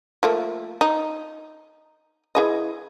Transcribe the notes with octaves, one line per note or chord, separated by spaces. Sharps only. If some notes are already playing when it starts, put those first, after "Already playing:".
F3 A3 A#3
D#4
E3 G#4 D#5